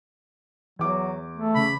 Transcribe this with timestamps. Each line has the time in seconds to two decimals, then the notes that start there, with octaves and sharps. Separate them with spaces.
0.79 E2 F#3 D6
1.37 A3
1.55 C#3 B5